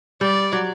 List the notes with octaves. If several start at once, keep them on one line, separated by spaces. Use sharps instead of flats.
G3 D5
F#3